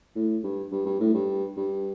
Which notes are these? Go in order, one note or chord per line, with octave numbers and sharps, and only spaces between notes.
A2
G2
G2
G2
A2
G2
G2